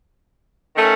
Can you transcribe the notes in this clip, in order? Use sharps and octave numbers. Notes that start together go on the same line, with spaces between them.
D#3 A3 C#4